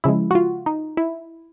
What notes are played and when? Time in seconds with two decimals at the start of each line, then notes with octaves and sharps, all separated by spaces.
0.04 C#3 F3 G#3 E4
0.31 F#4
0.35 F4
0.66 D#4
0.97 E4